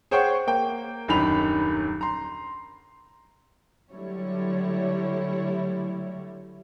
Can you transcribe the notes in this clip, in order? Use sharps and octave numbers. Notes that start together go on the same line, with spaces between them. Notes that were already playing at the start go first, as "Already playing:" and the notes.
G#4 C5 C#5 F#5 G5 C#6
A#3 G5
D#1 F#2 D3 D#3 B5 F7
A#5 C6
D3 F#3 G3 A3 E4 C#5